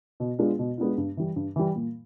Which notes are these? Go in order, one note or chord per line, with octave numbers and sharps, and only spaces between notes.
B2
G#3 B3 D4 F4
B2
G#3 B3 D4 F4
G2
E3 G3
G2
E3 G3
A#2